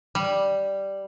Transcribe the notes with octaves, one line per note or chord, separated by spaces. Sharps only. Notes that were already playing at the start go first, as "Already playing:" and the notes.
G3